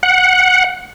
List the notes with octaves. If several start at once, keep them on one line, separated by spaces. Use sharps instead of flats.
F#5